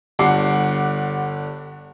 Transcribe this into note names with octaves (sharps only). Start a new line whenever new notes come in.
G1 D3 G3 F#5 D6 C7